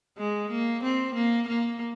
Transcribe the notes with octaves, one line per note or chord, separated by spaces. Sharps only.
G#3
A#3
C4
A#3
A#3